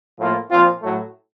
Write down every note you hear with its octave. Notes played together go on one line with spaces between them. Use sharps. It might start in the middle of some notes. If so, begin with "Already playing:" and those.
A2 F3 A#3 F4
A#2 F3 C4 F4
A2 F#3 A3